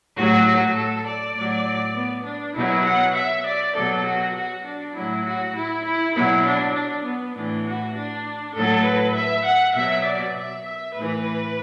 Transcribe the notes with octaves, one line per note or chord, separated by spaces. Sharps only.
A2 F#3 F#4
F#4
A4
D5
A2 F#3
B3
D4
B2 F#3 E4
F#5
E5
D5
B2 F#3 A4
F#4
F#4
D4
A2 F#3 E4
F#4
E4
E4
B2 F#3 E4
D4
D4
B3
A2 E3 D4
F#4
D4
A2 F#3 A4
B4
E5
F#5
B2 F#3 E5
D5
E5
E5
A2 E3 B4